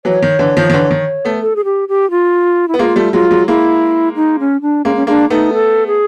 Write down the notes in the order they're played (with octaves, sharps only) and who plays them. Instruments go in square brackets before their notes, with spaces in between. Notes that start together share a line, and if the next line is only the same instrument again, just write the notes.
[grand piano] E3 F#3 [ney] C#5
[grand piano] D#3
D3 E3
D#3 F3
D#3
D3 E3
D#3
A3 B3
[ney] A4
G#4
G4
G4
F4
E4
[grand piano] B3
[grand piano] G#3 A#3 [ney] F4
[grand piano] G3 A3
[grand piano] F#3 G#3 [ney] F4
[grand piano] F#3 G#3
[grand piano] G#3 A#3 [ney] E4
[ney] D#4
C#4
D4
[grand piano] G#3 A#3 [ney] C#4
[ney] C#4
[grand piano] G#3 A#3 [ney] D4
[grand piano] A3 B3 [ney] D#4
[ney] A4
G#4